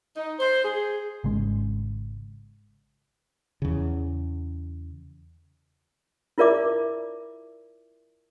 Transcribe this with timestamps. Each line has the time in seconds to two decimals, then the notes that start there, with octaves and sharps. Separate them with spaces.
0.17 D#4
0.39 C5
0.63 G#4
1.24 G#1 C#3 G#3
3.62 E2 C#3
6.38 E4 F4 A#4 D5 E5 D6